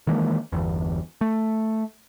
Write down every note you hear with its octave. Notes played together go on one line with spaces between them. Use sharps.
D#3 E3 G#3 A#3
G1 E2
A3